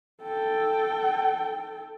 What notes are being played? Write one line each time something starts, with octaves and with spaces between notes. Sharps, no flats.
A4 G5